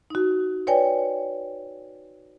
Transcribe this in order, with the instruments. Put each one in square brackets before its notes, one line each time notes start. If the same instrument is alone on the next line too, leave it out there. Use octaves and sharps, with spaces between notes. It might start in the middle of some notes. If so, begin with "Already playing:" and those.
[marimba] D#4 F#4
B4 C#5 D5 G5 G#5